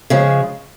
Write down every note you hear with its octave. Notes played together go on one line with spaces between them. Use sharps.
C#3 F3 G#3